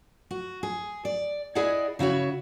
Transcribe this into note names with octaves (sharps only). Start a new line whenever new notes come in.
F#4
G#4
D5
E4 G#4 D5 D#5 F#5
C#3 E4 F#4 C#5